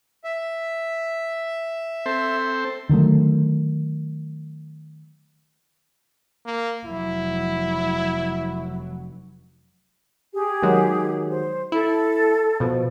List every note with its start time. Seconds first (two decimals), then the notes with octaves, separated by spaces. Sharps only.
0.24 E5
2.06 C4 A4 C5
2.89 D3 D#3 F#3 A3
6.46 A#3
6.86 F1 F#3 E4
10.33 G4 G#4
10.63 D#3 F#3 G#3
11.30 C5
11.72 E4 A4
12.60 B2 F3